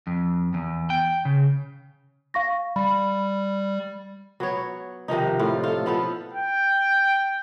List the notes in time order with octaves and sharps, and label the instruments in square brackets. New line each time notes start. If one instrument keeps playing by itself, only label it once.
[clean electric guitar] F2
E2
G5
C#3
[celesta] F5 C#6 A#6
[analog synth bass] G3 [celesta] B5
[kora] F#3 B3 C#5
C3 D#3 F3 D#4
A2 F4
F4 A4
F3 B3 F4 A4
[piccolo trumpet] G5